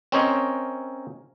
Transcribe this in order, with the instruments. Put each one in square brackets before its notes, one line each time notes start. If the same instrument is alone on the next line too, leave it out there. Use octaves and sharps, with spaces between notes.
[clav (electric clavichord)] C4 C#4 A#4 C5 C#5 D#5